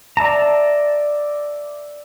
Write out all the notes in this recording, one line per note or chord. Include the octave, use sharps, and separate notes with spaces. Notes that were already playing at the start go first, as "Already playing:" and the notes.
D5 E5 A5 A#5